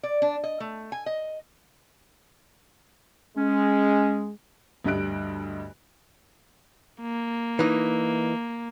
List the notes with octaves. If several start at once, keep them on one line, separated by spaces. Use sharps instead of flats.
D5
D4
D#5
A3
G#5
D#5
G#3 C#4
D2 G2 G3 D#5 F#6 D7
A#3
E3 D#4